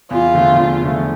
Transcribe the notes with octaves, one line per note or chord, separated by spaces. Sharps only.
E2 F4
D3 F3 A3
E2
D3 F3 A3